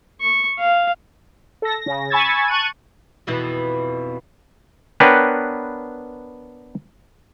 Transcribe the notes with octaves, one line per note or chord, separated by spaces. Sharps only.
C#6
F5
A4 A#6
C#3 A#6
G#5 B5 C#6 E6 G#6 A6
A5 C#6 F#6 D#7
F2 B2 E3
B3 D4 A#4 B4 C#5 G5